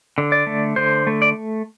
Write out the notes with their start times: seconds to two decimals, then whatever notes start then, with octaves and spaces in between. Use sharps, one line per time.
0.18 D3
0.32 D5
0.47 A3
0.76 D3 C5
1.07 A3
1.22 D5